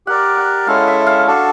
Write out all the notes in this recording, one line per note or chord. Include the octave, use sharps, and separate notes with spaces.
G4 A#4 D5 F#5
F#5
G#3 C#4 E4 A4 F5
E5
F5
D4 F#4 A4